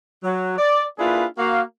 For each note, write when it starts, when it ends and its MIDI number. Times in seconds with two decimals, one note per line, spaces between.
0.23 0.56 54
0.57 0.84 74
0.98 1.24 58
0.98 1.24 62
0.98 1.24 64
0.98 1.24 65
0.98 1.24 68
0.98 1.24 71
1.37 1.61 58
1.37 1.61 66
1.37 1.61 77